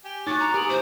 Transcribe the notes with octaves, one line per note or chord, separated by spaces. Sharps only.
G4 G#5
A2 D#4 F#4 C#5 D6 A6
A#5
B3 G4 G#4 A#4 D6 F#7
A2 E3 C5